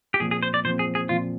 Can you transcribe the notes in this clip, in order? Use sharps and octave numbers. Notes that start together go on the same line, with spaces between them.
G4
A#2 F3 C4 G#4
G#4
C5
D5
A#2 F3 C4 C5
G#4
G#4
A#2 F3 C4 F4